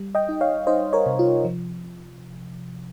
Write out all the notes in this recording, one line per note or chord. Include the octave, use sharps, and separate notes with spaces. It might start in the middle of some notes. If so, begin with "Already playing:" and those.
Already playing: G3
D#5 G5
D#4
C#5 F5
D#4 C5 D#5
A#4 C#5
C3
F4
F3